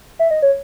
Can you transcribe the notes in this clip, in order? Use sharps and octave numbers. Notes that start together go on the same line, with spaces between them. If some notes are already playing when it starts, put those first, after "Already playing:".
E5
D#5
C#5